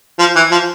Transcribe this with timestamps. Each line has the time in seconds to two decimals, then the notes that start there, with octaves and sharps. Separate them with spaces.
0.19 F3
0.36 E3
0.51 F3